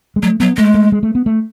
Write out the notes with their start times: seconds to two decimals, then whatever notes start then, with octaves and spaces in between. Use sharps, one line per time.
0.16 G#3
0.23 F#3 A3
0.40 F#3 B3
0.57 G#3 A3
0.74 A3
0.92 G#3
1.03 A3
1.15 B3
1.26 A3